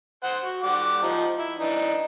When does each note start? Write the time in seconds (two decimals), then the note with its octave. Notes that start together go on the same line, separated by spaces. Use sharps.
0.23 C5 F#5
0.44 F#4
0.63 G3 F#5 D6
1.02 F3 D#4
1.39 E4
1.58 E3 D4 D#4